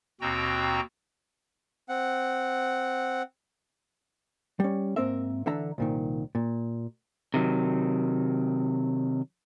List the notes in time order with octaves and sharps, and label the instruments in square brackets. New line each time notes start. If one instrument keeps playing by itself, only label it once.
[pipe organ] D#2 B2 C4 F#4 G5 A#5
[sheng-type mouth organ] C4 F#5
[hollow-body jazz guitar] G3 C#4
G#2 D3 A#3 C4 A#4 E5
D3 E3 D4 E5 A#5
C2 A#2 D#3
A#2
[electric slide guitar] C3 D#3 F#3